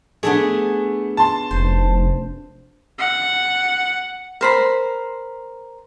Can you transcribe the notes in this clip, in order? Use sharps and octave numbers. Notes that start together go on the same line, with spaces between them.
A3 B3 D4 G#4
A5 C6
F1 C5
F#5
A#4 C5 B5